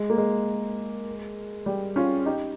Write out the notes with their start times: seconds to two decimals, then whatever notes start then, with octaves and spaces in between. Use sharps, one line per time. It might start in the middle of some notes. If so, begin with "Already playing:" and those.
Already playing: G#3
0.10 A#3
0.18 G#3
1.66 G3
1.96 C#4 F4
2.26 D#4 G4